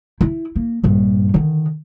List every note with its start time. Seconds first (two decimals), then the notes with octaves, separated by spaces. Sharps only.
0.21 E4
0.56 A#3
0.83 A#1 G2
1.34 D3 D#3